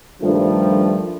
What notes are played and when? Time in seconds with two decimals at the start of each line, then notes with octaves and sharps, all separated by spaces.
0.22 G2 D#3 F3 G3 A3 D4